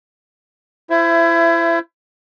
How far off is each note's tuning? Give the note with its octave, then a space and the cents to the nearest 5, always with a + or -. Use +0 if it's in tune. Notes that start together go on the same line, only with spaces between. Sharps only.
E4 +30 C5 +0 E5 +20